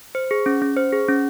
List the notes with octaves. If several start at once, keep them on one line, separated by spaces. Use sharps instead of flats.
C5
G#4
C#4
C#4
C5
G#4
C#4